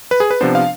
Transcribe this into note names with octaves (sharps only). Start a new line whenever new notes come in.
B4
G#4
B4
C3 F3 B3 D4 C5
F5